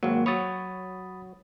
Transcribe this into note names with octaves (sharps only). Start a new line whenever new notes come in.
G#1 F#3 A#3
F#3 C#5 B5 D#6 A6